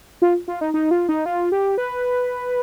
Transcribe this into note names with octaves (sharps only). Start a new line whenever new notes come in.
F4
F4
D#4
D#4
F4
D#4
F4
G4
B4